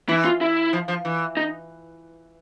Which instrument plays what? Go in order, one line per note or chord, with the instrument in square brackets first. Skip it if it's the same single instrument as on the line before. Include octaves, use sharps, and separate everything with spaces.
[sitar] E3 [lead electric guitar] E4
[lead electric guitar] F4
E4
[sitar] F3
F3
E3
[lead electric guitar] D#4